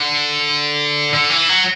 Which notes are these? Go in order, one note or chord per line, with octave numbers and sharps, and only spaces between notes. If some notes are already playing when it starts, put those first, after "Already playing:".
Already playing: D3
D3
E3
F#3